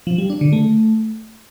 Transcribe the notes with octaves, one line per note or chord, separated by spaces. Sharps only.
F3
G3
D4
D3
A3